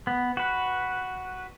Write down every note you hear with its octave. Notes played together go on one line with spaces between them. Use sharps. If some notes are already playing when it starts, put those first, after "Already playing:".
B3
F#4 B4